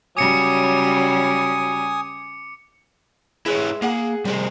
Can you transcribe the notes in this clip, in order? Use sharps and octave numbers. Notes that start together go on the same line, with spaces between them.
C#3 F#3 G3 G#5 D6 D#6 C#7
G#3 E4 B4 C#5 E5
A#3 G#4 F#5
C3 D#3 G3 C4 G#4